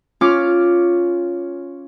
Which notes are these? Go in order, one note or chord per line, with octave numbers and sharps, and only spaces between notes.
C#4 F4 D6 F6